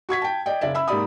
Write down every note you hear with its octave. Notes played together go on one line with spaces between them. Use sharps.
F#4 C#6 G#6 B6
G5 A5
D5 D#5 G5
F#1 C#3 D5 E5
E5 B5 E6
G#2 A#3 G4 D5 B5 D#6